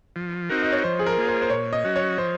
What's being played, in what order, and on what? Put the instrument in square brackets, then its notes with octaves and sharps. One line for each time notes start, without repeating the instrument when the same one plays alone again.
[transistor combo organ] F3
C4 D#4 F#4 A#4
[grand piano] D#5
C#5
[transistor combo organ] F3 [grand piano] C5
[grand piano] G#4
A#4
[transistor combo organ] A#3 F4 G#4
[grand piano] C5
C5
[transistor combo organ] A#2 [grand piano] C#5
[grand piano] D#5
[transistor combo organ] F#3 C#4 F#4
[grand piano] C#5
[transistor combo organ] F3 [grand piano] C5